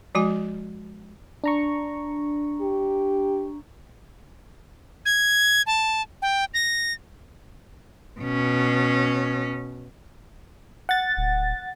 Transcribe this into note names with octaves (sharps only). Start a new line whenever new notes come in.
F3 G#3 F#4 G#5
D4 A#5 C#6
G4
G#6
A5
G5
A#6
B2 C#4
F#5 A6
D1